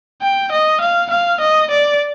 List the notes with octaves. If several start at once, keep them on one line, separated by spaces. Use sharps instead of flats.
G5
D#5
F5
F5
D#5
D5